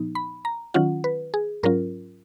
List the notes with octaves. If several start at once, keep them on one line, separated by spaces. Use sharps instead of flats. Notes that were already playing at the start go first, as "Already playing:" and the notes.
Already playing: A#2 F3 B3 D#4
B5
A#5
D#3 F#3 C#4 F4 F#5
B4
G#4
G#2 F#3 C#4 F4 A#4